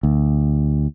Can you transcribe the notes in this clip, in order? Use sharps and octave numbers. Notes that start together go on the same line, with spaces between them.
D2